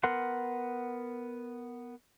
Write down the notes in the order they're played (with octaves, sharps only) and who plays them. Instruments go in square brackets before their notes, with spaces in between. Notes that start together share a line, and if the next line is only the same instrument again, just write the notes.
[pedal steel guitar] B3 A#4 F#5 C6